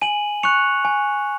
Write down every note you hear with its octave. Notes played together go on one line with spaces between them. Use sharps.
G#5 D#7 F#7
C#6 F#6 C#7 F7
G#5